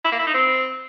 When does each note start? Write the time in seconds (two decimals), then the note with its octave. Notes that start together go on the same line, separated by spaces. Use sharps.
0.04 E4
0.12 A#3
0.19 E4
0.27 D#4
0.34 C4